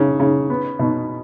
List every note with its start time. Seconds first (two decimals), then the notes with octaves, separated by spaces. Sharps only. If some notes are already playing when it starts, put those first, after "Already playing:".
Already playing: C#3
0.20 C#3
0.50 B3
0.79 B2